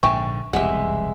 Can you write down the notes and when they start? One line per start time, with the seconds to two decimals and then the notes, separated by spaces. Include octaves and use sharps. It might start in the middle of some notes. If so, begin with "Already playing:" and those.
0.03 A#1 G#2 D3 E5 G5 G#5 C#6
0.53 E1 C2 F2 G#3 G4 E5 F#5